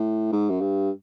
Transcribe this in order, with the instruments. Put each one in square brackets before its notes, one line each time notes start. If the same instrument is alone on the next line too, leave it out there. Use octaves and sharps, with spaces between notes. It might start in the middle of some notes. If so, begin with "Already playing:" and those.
Already playing: [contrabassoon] A2
G#2
F#2
G2